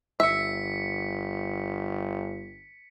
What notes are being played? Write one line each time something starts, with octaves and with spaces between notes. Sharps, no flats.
G1 E5 B6 C#7